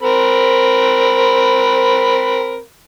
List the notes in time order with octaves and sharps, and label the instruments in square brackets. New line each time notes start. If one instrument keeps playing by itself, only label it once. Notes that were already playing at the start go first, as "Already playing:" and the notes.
[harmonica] C4 A#4 B5